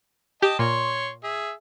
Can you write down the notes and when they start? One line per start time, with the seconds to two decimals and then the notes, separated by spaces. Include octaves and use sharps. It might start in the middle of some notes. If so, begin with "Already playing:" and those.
0.42 G4 D#5 G5 A5
0.59 A#2 C#5 C6
1.23 G#4 E5